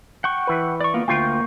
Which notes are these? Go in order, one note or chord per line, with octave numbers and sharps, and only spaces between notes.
F#5 G5 C#6
E3 B4
D5 C#6
A#3 B3 F4
D2 A#3 F4 G5 C#6 G6